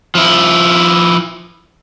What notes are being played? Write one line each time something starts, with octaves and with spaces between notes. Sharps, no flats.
F3 E4